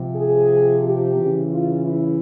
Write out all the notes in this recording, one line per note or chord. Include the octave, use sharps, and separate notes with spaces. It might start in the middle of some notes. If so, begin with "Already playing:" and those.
Already playing: C3 F3
G#4
G4
C#3 E3
F4
E4